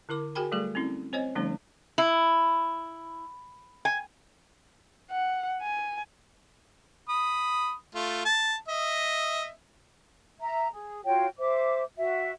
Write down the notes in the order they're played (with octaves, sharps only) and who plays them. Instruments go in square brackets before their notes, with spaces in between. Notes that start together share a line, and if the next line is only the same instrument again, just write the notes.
[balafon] D3 E4 A#4 D6
F#4 G#4 A#4 G5 G#5 B5
F#3 G3 A3 G#4 A4
C4 C#4 E4
C4 C5 C#5 D#5 G#5
D3 F3 G3 A3 C#4 D#4
[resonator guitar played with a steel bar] E4
G#5
[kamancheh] F#5
G#5
[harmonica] B5 D#6
A3 F4
A5
D#5 E5
[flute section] E5 A#5
G#4
F4 F#4 C#5 G5
C5 E5 D6
F#4 E5